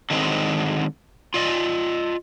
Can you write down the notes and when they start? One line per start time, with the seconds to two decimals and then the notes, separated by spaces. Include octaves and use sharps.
0.10 D3 D#3 F#3 G#3 A#3 C4
1.34 F4 D5 D#5